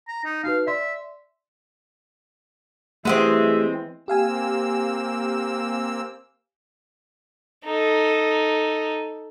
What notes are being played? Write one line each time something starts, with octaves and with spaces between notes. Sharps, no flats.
A#5
D#4
D#4 F#4 B4 F5
D5 E5 C6
E3 G#3 A3 B3 C4 G4 G#4 E5
A#3 C4 G4 F5 G#5 E6
D#4 A4